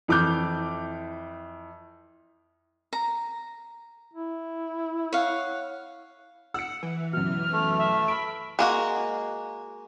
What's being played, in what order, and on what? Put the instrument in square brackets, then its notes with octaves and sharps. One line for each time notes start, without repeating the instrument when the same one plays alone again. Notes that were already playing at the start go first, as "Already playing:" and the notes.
[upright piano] F2 E3 D6 F6 G6
[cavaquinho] A#5
[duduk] E4
[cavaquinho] C#5 F5 F#5
[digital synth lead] F#5 [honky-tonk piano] E6 C#7
[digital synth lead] E3
[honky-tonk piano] F#2 B2 [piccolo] F6
[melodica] A3
[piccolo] E5
[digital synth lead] E5 [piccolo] B5 [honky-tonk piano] D7
[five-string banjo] G#3 A#3 F#4